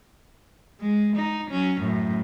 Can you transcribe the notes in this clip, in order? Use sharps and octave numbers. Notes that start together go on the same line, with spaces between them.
G#3
D#4
F#3 C#4
F#2 A2